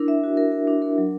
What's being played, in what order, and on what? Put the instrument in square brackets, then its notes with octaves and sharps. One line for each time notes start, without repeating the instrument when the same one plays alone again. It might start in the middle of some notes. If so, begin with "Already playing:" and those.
Already playing: [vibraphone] D4 E4 A#4
E5
F#4
A#4
A#4
D4
A#4
F#3